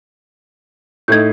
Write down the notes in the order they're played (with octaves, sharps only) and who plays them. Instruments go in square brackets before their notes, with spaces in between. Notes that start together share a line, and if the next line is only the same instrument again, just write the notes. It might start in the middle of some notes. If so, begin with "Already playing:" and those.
[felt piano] A2 A3 D#4 [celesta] G6 G#6